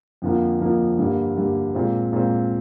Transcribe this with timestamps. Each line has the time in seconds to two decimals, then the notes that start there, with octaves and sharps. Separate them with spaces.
0.22 F2 D3 F3 A#3
0.60 F2 D3 F3 A#3
0.99 G2 D3 G3 A#3
1.36 G2 D3 G3 A#3
1.75 A#2 G#3 C4
2.12 A#2 G#3 C4